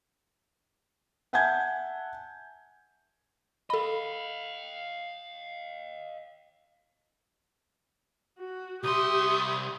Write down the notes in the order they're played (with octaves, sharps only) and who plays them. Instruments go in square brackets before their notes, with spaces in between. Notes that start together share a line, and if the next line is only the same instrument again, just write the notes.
[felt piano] E5 F#5 G#5 A5 G6 G#6
[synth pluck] A4 B5 [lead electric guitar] D#5 F5
[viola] F#4
[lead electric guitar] C2 C6 [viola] G4 E5 [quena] D#6